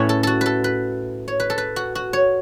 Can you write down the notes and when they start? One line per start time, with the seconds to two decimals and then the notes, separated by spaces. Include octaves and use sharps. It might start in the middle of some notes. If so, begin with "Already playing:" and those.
Already playing: A2 A3 C#4 E4 B4 C#5
0.09 A4
0.23 F#4 A4
0.41 A4 B4
0.64 B4
1.28 C#5
1.40 B4
1.50 A4
1.58 B4
1.76 F#4
1.95 F#4
2.13 C#5